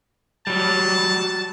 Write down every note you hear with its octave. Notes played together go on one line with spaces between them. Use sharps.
F#3 G3 A5